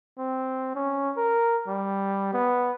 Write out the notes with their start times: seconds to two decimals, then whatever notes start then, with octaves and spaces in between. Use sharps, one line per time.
0.18 C4
0.76 C#4
1.17 A#4
1.68 G3
2.33 B3